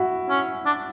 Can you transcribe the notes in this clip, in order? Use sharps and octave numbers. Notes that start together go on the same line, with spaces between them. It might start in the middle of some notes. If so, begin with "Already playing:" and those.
Already playing: E4 F#4
C#4
D4